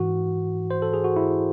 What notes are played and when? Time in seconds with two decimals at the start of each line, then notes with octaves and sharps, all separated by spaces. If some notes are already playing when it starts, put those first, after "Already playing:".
Already playing: G#2 E3 F#4
0.71 C5
0.82 A4
0.94 G#4
1.04 F#4
1.16 E4